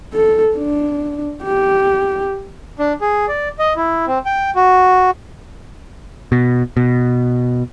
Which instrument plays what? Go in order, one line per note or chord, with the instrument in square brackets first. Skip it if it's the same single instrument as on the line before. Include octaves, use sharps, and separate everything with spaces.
[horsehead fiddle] A4
D4
G4
[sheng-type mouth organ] D4
G#4
D5
D#5
E4
C4
G5
F#4
[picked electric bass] B2
B2